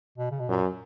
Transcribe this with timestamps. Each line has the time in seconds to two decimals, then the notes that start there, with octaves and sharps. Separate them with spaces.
0.18 B2
0.31 C#3
0.40 B2
0.49 F#2 A#2